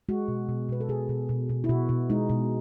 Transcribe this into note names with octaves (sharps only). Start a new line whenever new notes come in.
G#3 F#4
B2
B2
B2 B4
A4
B2 G#4
B2
B2
B2
E4
B2 F#4
B2
G#3 D#4
B2